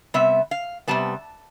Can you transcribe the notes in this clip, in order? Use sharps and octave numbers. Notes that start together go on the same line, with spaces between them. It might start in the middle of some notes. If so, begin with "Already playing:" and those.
C3 G3 B3 E5
F5
C3 G3 B3 A5